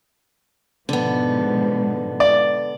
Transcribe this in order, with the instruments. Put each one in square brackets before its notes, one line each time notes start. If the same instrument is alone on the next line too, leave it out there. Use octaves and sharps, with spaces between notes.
[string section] G#2 B2 F3 [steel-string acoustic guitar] D3 B3
[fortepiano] D5